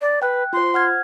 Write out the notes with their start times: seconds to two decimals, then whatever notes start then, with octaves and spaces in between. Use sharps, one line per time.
0.01 D5
0.22 B4 G5 F#6
0.53 F4 C5 C6
0.74 F#5 F6 G#6